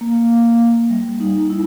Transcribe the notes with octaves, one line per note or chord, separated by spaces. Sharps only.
A#3
A#3
A#3
G3
D#4
E4